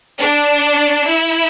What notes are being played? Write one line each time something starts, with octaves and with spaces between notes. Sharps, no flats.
D4
E4